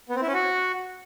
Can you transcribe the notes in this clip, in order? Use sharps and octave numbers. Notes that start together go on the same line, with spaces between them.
B3
C4
E4
C#4
F#4